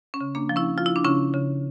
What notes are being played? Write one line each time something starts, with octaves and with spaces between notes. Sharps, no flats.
C#4
C#3
A#3 D4
F3
C#4 E4
F3 F4
E4
D4
C#3 C#4 E4
C#3